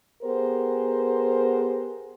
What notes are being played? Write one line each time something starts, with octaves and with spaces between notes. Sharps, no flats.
B3 G4 G#4 A#4 C5